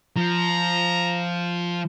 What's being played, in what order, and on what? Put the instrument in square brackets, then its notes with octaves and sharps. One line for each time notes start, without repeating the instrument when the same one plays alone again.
[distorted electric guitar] F3 [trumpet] A#5